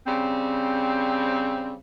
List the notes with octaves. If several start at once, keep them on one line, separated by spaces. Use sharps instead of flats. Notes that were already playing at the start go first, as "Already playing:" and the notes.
C#3 G3 C4